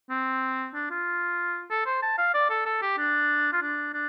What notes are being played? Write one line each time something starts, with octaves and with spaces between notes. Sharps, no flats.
C4
D4
F4
A4
C5
A5
F5
D5
A4
A4
G4
D4
F4
D4
D4